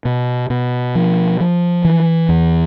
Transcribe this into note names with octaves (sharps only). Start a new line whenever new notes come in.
B2
B2
F3
F3
E3
E2